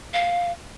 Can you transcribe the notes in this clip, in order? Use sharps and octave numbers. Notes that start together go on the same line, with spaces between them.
F5